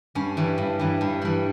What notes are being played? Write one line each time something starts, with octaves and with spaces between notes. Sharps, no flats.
G2 C#4
E3 G3
G2
E3 G3
G2
E3 G3